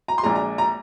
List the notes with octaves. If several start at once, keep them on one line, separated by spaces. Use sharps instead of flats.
A#5
C6
A#1 A#2 G#3 A#5
A#5
A#5